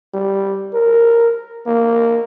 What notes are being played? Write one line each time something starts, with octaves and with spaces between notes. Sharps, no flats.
G3
A#4
A#3